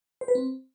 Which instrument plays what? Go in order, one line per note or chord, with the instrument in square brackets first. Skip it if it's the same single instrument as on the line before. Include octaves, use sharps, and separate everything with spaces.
[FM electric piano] C5
B4
C4